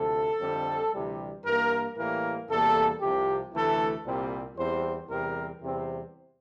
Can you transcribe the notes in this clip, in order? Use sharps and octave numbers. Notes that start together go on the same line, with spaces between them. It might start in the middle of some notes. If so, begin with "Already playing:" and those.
Already playing: D2 C3 F3 A4
F2 D3 G3 C4
D2 C3 E3 G3
G2 E3 A#3 A#4
A2 E3 G3 A#3 A#4
E2 C3 G3 A#3 A4
C2 C3 F3 G4
D2 C3 E3 A3 A4
C2 A#2 G3 C4
E2 E3 G3 C4 C5
E2 C3 G3 C4 A#4
E2 C3 G3 C4